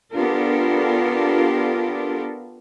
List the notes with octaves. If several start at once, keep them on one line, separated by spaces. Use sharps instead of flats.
B3 D4 F4 G4 A4 A#4